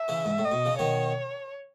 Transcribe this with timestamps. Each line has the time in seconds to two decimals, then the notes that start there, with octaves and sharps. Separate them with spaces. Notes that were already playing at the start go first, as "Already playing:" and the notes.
Already playing: E5
0.08 C#3 E3
0.25 G#2
0.38 A2
0.44 D#5
0.52 B2
0.66 C#3
0.78 B2 D#3 C#5